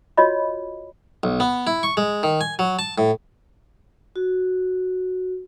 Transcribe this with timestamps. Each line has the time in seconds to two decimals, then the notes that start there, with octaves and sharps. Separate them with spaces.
0.17 F4 F#4 C#5 D#5 B5
1.23 B1
1.40 B3
1.67 E4
1.83 C#6
1.97 G#3
2.23 D#3
2.41 G#5
2.59 F#3
2.79 A5
2.98 A2
4.16 F#4